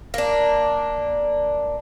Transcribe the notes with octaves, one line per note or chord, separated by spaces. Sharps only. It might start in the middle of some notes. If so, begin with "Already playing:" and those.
A#3 D4